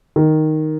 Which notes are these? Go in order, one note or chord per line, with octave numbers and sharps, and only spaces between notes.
D#3